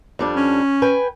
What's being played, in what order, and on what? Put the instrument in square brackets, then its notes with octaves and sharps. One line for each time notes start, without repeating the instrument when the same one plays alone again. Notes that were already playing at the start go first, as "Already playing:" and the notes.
[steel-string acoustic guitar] F2 G3 D4
[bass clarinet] C#4
[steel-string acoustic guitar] B4 G5 G#5